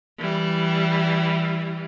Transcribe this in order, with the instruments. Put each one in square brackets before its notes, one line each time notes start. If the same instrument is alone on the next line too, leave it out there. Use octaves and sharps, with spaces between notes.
[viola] E3 G3